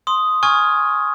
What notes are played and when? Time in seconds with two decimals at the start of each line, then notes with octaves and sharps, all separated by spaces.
0.07 C6 D#6
0.43 G#5 C#6 D#6 F6 G#6